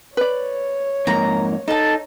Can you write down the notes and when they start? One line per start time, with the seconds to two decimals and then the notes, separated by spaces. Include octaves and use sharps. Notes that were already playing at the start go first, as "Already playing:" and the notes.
0.17 B4 C#5 D5
1.07 F2 G#2 A#3 A#5
1.68 D#4 A4 A5